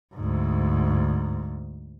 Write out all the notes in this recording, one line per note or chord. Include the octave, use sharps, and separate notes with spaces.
D2 G#2